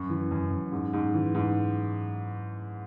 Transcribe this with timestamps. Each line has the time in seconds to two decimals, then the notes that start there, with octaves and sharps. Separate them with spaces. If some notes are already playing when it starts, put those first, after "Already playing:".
Already playing: F#2 C#6
0.09 E3
0.31 F#2
0.51 F#2
0.72 G#2
0.93 G#2
1.14 E3
1.35 G#2